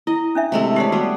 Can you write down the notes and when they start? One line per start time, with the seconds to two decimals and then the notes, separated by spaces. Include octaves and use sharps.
0.07 E4 D#5
0.35 C#4 D4 E5
0.52 C3 G#3 A3
0.76 G4 B4 C#5 D5
0.92 G3 B3 F#4 B4